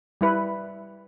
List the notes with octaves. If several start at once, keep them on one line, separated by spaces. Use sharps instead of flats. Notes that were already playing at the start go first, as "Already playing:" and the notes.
G3 E4 B4